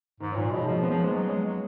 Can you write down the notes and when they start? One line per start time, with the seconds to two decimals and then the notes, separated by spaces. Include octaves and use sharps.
0.20 G#2 D#3
0.31 D#3 F#3
0.36 A#2
0.43 D#3 F#3
0.51 B2 F3 G#3
0.67 F3 F#3 A#3
0.83 G#3 B3
0.90 F3
0.98 A#3 C#4
1.05 G#3
1.14 F#3
1.30 G#3
1.45 F#3